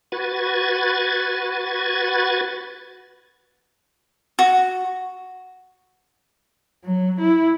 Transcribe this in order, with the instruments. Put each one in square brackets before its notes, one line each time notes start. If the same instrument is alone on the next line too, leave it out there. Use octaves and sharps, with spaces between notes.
[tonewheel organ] F#4 B4 G#6 A6
[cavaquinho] F#4
[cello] F#3
E4